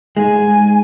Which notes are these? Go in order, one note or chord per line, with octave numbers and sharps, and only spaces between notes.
G#2 G#3 G#5